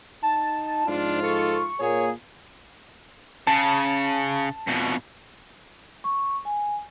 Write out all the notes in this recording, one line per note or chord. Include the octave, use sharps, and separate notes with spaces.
D#4 A5
G#2 F3 D4 F4
A4 C#6
A#2 A#3 G#4 C#5
C#3 A5
F2 B2
C#6
G#5